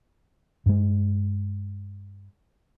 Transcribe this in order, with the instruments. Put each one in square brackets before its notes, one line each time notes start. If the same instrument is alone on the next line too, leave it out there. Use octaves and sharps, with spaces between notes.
[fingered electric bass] G2 G#3